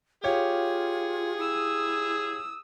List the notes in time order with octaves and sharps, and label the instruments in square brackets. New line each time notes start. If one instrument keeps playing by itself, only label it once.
[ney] F4 [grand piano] G4 C#5 F5 [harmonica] G#4
[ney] E4 [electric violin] D#6 E6